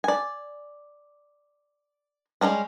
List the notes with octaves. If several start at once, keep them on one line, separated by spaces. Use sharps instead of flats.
D5 G#5
G3 G#3 A#3 C#4